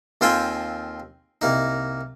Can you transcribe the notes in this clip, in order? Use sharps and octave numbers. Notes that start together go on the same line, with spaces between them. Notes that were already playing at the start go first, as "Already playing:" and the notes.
D#2 C4 F4 A4 G5 G#5
C2 A#3 D#4